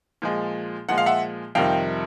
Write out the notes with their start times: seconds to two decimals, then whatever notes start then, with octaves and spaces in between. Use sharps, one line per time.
0.22 A#2 F3 G#3
0.89 A#2 F3 G#3 F#5
0.98 F5
1.06 E5 F#5
1.55 F2 C3 D#3 G3 F5 G5